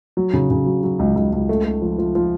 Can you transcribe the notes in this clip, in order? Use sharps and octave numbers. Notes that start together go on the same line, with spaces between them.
F#3
C#3
C#3
F#3
F#3
C#2
C#2
C#2
A3
A3
F3
F3
F3